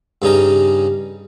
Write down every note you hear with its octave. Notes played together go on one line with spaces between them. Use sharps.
G2 C#3 D#4 A#5